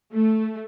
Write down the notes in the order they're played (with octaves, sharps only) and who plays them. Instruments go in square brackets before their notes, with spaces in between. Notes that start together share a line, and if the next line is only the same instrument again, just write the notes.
[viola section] A3